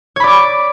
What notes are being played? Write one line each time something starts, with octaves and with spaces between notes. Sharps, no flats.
C#5 D5 B5 D6